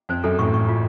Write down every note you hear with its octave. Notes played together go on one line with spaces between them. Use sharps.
F2 C5
F#2 A4
A1 A2 C#6
C#6
F4